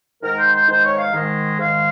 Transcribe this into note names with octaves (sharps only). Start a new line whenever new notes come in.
G#2 D#3 G#3 D#4 A#4
C5
C5
G#2 D#3 G#3 D#4 C5
C#5
F5
G#2 D#3 G#3
G#2 D#3 G#3 F5